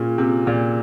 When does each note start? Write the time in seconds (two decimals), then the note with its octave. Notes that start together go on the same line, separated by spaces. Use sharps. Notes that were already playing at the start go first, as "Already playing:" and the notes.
Already playing: A#2 C#4 F4 G#4
0.18 C3 F4
0.47 A#2 G#4